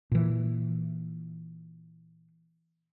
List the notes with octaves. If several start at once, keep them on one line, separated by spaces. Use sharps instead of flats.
A#2 E3